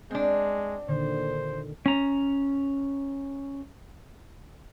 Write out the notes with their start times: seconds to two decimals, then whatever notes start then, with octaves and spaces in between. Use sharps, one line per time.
0.11 G#3 C4 D4
0.88 A#2 D3 D#3 C5
1.86 C#4 A#5